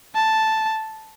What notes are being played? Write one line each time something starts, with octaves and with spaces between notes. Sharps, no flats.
A5